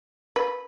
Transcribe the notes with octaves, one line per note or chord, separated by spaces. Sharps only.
B4